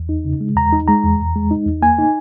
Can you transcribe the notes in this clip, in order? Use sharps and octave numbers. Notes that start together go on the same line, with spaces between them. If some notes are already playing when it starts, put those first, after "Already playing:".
Already playing: E2
D#4
C#3
G#3
E2 A#5
D#4
G#3 A#5
E2
E2
G#3
D#4
E2
A#3 G#5
D#4